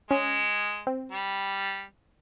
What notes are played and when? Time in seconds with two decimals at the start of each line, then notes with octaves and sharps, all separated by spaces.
0.10 G#3 C#4
0.87 C4
1.12 G3